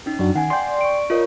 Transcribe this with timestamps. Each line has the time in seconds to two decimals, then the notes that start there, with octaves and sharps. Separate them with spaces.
0.06 C#4 D#4
0.19 F#2 D4 F#4
0.36 D#3 F#5 G#5
0.50 D5 G5 C6
0.81 C#6 D7
1.10 D#4 F4 A#4 C#5